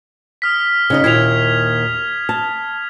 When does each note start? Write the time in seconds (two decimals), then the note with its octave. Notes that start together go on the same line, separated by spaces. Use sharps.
0.42 D#6 F6 B6
0.90 C#3 D#4 D#5
1.04 D#2 A#2 E4 G#6 C7 F7
2.29 A5